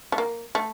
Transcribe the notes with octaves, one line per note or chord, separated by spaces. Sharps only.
A3
A#3
A3